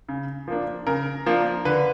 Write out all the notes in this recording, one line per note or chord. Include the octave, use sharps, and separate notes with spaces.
C#3
F3 A#3 D4
C#3 A#4
F3 A#3 D4
D3 B4